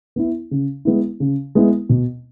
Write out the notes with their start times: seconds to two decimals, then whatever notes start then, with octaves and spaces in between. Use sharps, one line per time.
0.16 B3 E4
0.51 C#3
0.85 G#3 B3 E4
1.20 C#3
1.55 G#3 B3 E4
1.89 B2